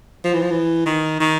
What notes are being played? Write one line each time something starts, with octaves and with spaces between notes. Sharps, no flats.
F3
E3
F3
E3
D#3
D#3